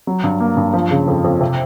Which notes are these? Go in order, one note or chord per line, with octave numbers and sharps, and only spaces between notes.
F#3
G2
A#3
G2
F3
C#3
F2
F2
C3